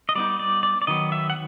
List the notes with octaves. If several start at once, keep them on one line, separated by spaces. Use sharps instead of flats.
D#5
G3 B3 D#4 D5
D5
D5
D5
D#3 F#3 B3 D#5
E5
F#5